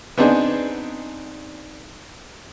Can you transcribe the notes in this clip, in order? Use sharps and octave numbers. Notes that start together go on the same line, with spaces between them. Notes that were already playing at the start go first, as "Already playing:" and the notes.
B3 C4 D4 D#4 G#4